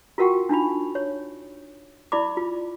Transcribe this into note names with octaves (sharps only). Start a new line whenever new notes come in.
F4 F#4 A#4 F#5 G5 C#6
D4 D#4 F4 B5
C#5
E4 D5 B5 D6
F4